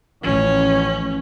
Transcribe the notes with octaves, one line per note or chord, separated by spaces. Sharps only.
A1 F3 C#4